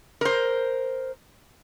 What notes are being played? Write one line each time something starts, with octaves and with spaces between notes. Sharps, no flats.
A#4 C5